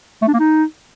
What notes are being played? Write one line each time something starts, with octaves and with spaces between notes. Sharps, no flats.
A3
D4
A#3
D#4